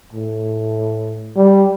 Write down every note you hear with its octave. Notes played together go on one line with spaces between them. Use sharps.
A2
G3